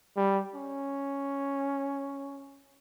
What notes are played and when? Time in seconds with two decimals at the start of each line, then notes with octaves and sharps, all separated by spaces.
0.17 G3
0.55 C#4